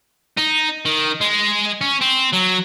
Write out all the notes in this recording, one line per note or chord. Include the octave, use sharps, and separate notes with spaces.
D#4
D#3
G#3
C#4
C4
F#3